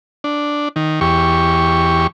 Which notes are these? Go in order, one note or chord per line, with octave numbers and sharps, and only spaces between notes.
D4
D#3
E2 G4 C#6